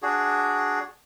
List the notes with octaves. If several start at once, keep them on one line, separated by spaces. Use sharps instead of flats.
D4 F#4 G#4